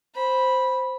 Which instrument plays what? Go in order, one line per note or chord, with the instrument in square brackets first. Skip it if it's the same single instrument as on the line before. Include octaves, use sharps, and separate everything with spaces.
[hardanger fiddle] C5 B5